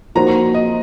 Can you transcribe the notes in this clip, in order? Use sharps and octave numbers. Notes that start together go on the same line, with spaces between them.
F3 A#3 D#4 F#4 C5 A#5
D#5